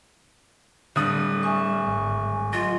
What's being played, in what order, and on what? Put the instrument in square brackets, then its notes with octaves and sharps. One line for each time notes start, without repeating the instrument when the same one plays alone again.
[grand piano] D1 D#6 [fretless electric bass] D3 [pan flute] G3
[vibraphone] E5 G#5 C#6
[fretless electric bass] G#1
[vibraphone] F#3 D#5 [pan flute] F4